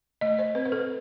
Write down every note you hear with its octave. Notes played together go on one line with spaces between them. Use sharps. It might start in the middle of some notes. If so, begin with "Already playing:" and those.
A3 D#5
C5
C4 B4
B4
A4